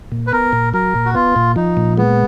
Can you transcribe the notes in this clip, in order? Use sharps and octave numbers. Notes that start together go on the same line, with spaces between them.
A#2
B4
B3 A#4
A#2
F#3 A#4
A#2
F#4
B3 F4
A#2
F3 D#4
A#2
G#3 B3